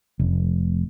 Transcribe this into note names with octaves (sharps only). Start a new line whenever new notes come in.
F1